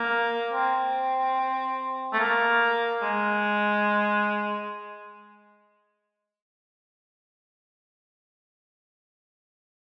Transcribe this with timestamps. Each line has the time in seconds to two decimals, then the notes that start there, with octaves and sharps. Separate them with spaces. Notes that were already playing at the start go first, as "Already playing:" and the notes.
Already playing: A#3
0.53 C4
2.13 A3
2.19 A#3
3.02 G#3